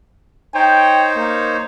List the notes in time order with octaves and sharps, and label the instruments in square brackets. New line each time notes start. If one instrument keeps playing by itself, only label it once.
[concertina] D#4 C5 C#5 [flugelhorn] G5
[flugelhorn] A#3